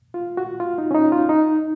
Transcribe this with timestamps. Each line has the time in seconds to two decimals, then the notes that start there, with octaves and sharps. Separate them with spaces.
0.14 F4
0.37 F#4
0.60 F4
0.78 D#4
0.91 C#4
0.94 D#4
1.12 F4
1.29 D#4